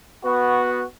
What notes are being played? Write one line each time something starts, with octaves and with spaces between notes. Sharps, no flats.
B3 F#4